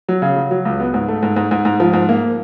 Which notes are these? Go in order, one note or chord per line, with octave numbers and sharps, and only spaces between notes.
F#3
C#3
F#3
F#3
C#2
B3
G#2
A3
G#2
G#2
G#2
G#2
F3
G#2
A#3